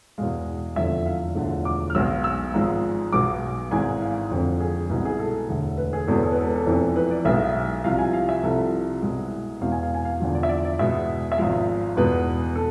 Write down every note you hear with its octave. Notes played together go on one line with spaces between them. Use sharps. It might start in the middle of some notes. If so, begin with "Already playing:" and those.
E2 B2 G#3 F5
F1 E2 D3 F3 E5
F5
E1 D2 D3 F3
D6
F6
B1 B2 G#3 E6
E6
G#1 G#2 F3 G#3
B1 B2 G#3 D6
G#1 G#2 E3 G#3 G#5
F5
F1 F2 D3
G#4
C2 B2 G#3
G#4
A4
E1 D2 D3
B4
G#4
E1 E2 B2 G#3 A4
B4
A4
B4
A4
B4
A4
F1 F2 E3
B4
D5
B1 B2 G#3 E5
C2 C3 F3 F5
G#5
F5
E5
C2 C3 F3 A4
C2 B2 G#3
E2 B2 G#3 F5
G#5
F5
G#5
F5
E2 D3 F3
D5
E5
D5
D5
E2 B2 G#3 E5
E5
G#1 G#2 F3 G#3 F5
E2 B2 G#3 B4
A4